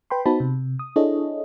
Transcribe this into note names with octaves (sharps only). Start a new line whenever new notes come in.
B4 G5 B5 C6
B3 D#4 F#4 C5 A5 B5
C3
D#6
D4 E4 G#4 A4 C#5 D#5